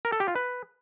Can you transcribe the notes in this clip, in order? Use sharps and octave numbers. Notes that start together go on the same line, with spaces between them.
A#4
A4
G4
F4
B4